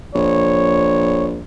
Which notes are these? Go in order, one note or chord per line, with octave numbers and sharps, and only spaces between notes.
A#1 C#5